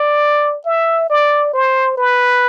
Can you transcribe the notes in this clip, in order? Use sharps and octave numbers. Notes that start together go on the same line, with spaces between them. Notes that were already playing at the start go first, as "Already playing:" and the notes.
Already playing: D5
E5
D5
C5
B4